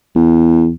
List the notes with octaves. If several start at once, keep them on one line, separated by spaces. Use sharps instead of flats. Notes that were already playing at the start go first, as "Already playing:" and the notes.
E2